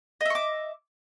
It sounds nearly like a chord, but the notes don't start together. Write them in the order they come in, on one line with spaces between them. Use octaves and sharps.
D#5 E5 C#6 D6